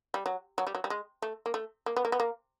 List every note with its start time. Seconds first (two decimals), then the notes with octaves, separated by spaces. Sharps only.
0.14 G3
0.26 F#3
0.58 F#3
0.67 G3
0.75 F#3
0.84 G3
0.90 G#3
1.22 A3
1.46 A#3
1.54 A3
1.86 A#3
1.96 B3
2.05 A#3
2.12 B3
2.20 A#3